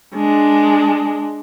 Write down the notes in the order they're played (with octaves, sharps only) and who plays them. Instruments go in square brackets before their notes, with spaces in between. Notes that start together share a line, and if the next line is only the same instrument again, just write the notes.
[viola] G#3 D4